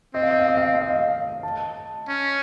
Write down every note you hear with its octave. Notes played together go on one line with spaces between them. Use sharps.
C4 D#5
F5
D#5
F5
D#5
F5
D#5
F5
D#5
F5
D#5
A5
C#4